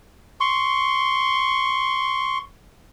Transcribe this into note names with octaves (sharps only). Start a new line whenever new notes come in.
C6 C#6